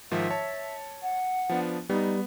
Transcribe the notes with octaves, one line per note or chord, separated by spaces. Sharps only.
G#2 D#3 F3 E5
C#5 A5
F#5
F3 B3 D4
G3 B3 D#4